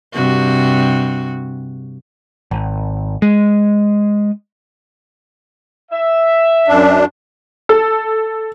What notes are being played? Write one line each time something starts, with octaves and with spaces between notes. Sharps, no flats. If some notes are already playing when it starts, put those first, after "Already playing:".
G2 C3 F#4
G#1
G#3
E5
F#2 D4
A4